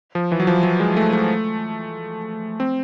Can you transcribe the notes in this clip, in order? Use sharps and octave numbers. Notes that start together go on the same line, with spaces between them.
F3
E3
F#3
F3
F#3
G#3
A3
A3
C4